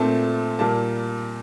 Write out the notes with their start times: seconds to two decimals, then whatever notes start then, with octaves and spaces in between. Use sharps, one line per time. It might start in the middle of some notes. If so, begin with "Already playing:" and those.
Already playing: A#2 A3 C4 A5
0.59 A#2 G3 A#3 A5